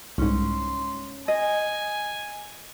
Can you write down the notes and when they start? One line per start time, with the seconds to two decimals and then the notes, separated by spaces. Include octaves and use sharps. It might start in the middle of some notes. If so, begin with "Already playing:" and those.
0.18 C2 G#2 C#4 C6
1.28 D#5 G#5